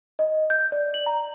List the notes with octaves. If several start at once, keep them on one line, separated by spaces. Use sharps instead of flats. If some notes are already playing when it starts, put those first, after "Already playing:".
D#5
G6
D5
F#7
A#5